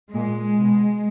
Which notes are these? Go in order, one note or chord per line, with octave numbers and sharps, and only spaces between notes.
A#2 G#3
B2